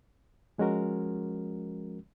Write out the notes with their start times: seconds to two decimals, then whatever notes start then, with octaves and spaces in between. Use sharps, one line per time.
0.58 F3 G#3 C#4 F#4 A#4